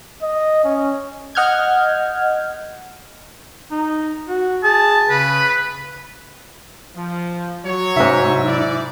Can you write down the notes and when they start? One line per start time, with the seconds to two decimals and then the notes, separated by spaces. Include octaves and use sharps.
0.23 D#5
0.64 C#4
1.35 D#5 F#5 F6 G6 G#6
3.71 D#4
4.28 F#4
4.63 G#4 A5
5.09 C#3 B4
6.96 F3
7.65 F#3 C#5
7.96 G#2 C3 D#4 E5 E6
8.47 E4 D5